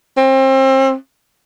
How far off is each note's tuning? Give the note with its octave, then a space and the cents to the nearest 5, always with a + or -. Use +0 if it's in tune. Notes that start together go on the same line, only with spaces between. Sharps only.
C4 +30